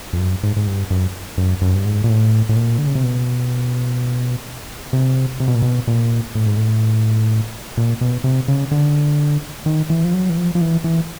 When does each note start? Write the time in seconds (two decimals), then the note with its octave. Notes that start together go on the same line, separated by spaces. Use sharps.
0.13 F2
0.19 F#2
0.43 G#2
0.56 G#2
0.67 G2
0.90 F#2
1.38 F#2
1.61 F#2
1.75 G2
1.85 G#2
2.04 A#2
2.09 A2
2.49 A2
2.56 A#2
2.78 D3
2.87 C#3
2.95 C3
3.03 B2
4.93 C3
5.40 C3
5.48 B2
5.55 A#2
5.62 B2
5.87 A#2
6.35 A2
6.46 G#2
6.57 A2
7.77 A#2
8.01 B2
8.24 C3
8.48 C#3
8.71 D3
9.66 D#3
9.90 E3
10.04 F3
10.14 F#3
10.30 E3
10.37 F3
10.55 F3
10.61 E3
10.84 E3